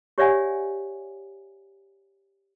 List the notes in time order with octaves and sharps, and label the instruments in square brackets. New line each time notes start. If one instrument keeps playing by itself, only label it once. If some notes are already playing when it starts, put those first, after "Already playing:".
[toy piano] G4 C#5 D5 E5 F#5 G#5